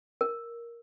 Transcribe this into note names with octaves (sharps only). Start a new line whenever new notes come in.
A#4